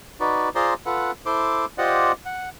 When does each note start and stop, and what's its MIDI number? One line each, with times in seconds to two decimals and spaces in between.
0.20 0.49 63
0.20 0.49 66
0.20 0.49 71
0.20 0.49 74
0.55 0.74 65
0.55 0.74 68
0.55 0.74 72
0.55 0.74 74
0.55 0.74 82
0.55 0.74 84
0.86 1.11 65
0.86 1.11 69
0.86 1.11 71
0.86 1.11 78
1.26 1.65 64
1.26 1.65 69
1.26 1.65 72
1.26 1.65 84
1.26 1.65 86
1.78 2.12 65
1.78 2.12 67
1.78 2.12 72
1.78 2.12 74
1.78 2.12 75
1.78 2.12 78
2.26 2.49 78